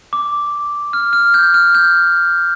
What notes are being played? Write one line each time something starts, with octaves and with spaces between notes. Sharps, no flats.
D6
F6
F6
G6
F6
G6